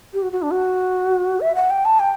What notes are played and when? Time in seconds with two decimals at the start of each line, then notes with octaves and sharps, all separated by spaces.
0.14 G4
0.22 F#4
0.32 F#4
0.42 D4
0.52 F#4
1.40 E5
1.55 F#5
1.70 G5
1.85 A5
1.99 G5